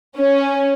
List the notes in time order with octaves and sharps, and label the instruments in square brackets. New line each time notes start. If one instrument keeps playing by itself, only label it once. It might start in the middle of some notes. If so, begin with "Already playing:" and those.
[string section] C#4